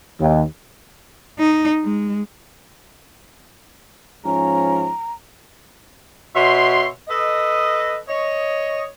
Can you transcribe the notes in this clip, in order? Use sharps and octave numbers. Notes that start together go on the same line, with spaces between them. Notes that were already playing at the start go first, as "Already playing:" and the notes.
D#2
D#4
G#3
G#2 F3 C#4 A#5
B2 C#5 E5 C6
A4 B4 D#5
C#5 D#5